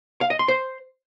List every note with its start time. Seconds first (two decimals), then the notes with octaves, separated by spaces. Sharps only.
0.21 F5
0.30 D#5
0.39 C6
0.48 C5